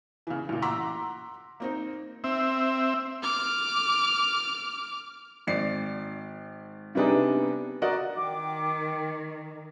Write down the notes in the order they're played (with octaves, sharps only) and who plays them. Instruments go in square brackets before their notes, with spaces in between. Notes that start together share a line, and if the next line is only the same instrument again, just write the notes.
[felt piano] C#3 E3
A1 A#2
F#5 A#5 C6 D6 E6 B6
A#3 C4 D#4
[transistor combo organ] C4 E5
[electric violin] D6 F6
[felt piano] G#1 D5 C7
C3 G3 B3 D4 D#4 G#4
F#4 A#4 D5 D#5 F#5
[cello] D#3 [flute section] G5 D6